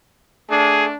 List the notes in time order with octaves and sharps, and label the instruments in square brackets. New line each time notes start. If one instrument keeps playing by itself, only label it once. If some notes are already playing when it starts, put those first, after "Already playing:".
[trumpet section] A3 D4 [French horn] G#4